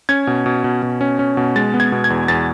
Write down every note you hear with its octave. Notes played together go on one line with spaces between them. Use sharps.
C#4 G#6
B2
B2
B2
B2
C#4
C#4
B2
G#3 A6
B3
G#6
B2
G#6
E2
E2 A6